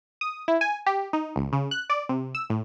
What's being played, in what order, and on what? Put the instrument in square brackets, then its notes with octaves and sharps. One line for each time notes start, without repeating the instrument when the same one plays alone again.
[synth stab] D#6
E4
G#5
G4
D#4
C#2
C#3
F#6
D5
C3
E6
A2